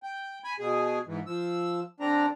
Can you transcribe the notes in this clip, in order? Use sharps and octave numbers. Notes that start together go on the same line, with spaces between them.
G5
G#5 B5
B2 G#4
G#2 E3
F3 E6
D3 C4 D4 A#5